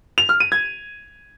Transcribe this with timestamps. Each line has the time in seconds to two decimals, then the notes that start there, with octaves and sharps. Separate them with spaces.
0.18 F7
0.29 F6
0.40 D#7
0.52 G#6